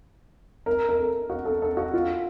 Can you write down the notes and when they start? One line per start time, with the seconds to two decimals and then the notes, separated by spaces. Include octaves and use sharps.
0.66 A#4
0.89 A#4
0.99 A4
1.30 F#4
1.45 A4
1.62 A4
1.77 F#4
1.94 F4